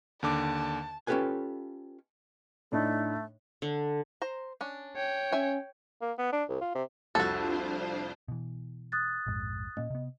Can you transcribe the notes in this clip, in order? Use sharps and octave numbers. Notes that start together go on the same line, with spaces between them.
D#2 D3 A5 D6
C#4 F4 G4 A4 B4 G#5
A2 A3 D4 D#4
D3
C5 A#5
C#4 D4
C#5 G5
C#4 E5 G#5
A#3
B3
D4
C2
F4
C3
C2 F2 D4 F4 F#4 A4 C5
B2 E3
D#6 F#6 A6
A#1 F2 G#2
A#2 A#3 C#4 D#5
C3 B3